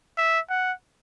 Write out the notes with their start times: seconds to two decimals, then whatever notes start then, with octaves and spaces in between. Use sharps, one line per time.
0.17 E5
0.50 F#5